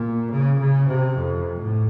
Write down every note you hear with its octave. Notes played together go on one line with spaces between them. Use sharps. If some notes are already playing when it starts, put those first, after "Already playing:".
Already playing: A#2
C#3
C#3
C3
F2
A2